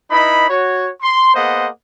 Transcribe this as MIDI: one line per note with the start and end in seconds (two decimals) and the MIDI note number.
0.11 0.48 63
0.11 0.48 64
0.11 0.48 71
0.11 0.48 75
0.11 0.48 83
0.49 0.89 66
0.49 0.89 73
1.01 1.35 84
1.35 1.68 58
1.35 1.68 59
1.35 1.68 68
1.35 1.68 72
1.35 1.68 75
1.35 1.68 78